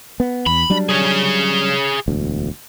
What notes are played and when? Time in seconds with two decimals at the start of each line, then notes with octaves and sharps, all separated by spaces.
0.20 B3
0.46 E2 B5
0.70 F#3 G3 D4
0.89 G#4 C#5
2.08 E1 D2